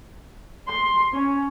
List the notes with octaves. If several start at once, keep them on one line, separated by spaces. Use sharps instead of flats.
C6
C#4